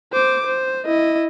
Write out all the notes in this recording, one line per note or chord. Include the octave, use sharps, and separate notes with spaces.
C5 D6
C5
E4 D#5